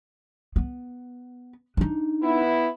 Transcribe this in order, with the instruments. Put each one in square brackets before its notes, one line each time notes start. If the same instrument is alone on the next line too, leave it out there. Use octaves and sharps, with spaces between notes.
[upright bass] B3
D4 D#4
[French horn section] B3 E4